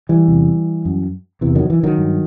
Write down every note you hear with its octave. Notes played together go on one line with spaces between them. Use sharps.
E3 G3
E2 C3
F#2
E2 C3 E3
D#3 F#3
E3
D#3 F#3
G2